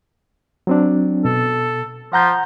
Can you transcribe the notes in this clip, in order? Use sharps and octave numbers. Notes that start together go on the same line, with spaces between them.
F#3 C4 D4
B2 A4
F3 F#5 A#5 G6